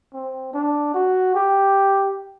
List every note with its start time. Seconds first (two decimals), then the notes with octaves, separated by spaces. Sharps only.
0.13 C4
0.54 D4
0.94 F#4
1.35 G4